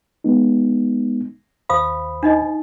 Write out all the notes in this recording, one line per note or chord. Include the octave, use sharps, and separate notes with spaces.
G#3 B3 D#4
D#2 C5 F5 B5 D#6
D4 D#4 D#5